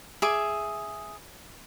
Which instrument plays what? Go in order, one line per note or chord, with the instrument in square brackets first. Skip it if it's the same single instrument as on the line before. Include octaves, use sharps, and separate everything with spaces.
[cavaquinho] G#4 E5 D6